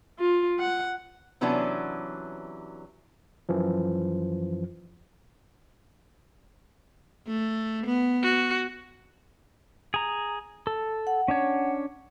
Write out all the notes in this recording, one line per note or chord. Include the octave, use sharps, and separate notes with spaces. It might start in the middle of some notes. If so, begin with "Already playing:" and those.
F4
F#5
C3 E3 F#3 B3 C#4 D4
F#2 E3 F3
A3
B3
F#4
G#4 A#5
A4
F#5
C#4 D4 C#5